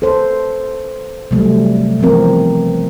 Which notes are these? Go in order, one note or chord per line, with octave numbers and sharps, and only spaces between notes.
A4 C5
C3 E3 F#3 G3 A3
E3 F3 B3 C4 A#4